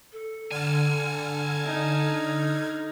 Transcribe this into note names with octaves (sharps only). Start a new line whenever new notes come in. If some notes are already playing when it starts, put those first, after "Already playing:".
A4
D3 G#5 A5 F6 G#6
D#4